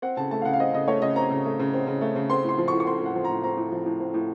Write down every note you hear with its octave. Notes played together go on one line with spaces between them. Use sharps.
C4 F#5
C#3 A5
A3 A5
F5
C#3 F#5
F5
C4 D#5
C#3 D#5
A3 C#5
C#3 D#5
C4 A#5
C#3
A3
C#3
C4
C#3
A3
C#3
C4 C6
A2 C6
F3
C#6
A2
C#6
C4 C6
A2 F#5
F3
A#5
A2
C4 A#5
A2
F3
A2
C4
A2